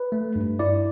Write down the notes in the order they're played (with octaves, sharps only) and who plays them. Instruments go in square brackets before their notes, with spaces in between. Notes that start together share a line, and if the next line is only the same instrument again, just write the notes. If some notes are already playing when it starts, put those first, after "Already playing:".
Already playing: [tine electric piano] B4
A3
G2
E4 D5